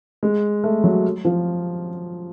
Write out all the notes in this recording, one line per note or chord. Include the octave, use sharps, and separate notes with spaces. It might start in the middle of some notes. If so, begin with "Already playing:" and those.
G#3
A3
F#3
F3